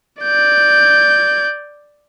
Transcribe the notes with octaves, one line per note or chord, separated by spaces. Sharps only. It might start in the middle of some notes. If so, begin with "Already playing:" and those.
D5 G6